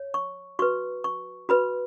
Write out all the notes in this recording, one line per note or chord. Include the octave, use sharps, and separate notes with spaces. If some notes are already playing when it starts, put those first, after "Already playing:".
Already playing: C#5
C#6
F#4 B4 C#6
C#6
F#4 B4 B5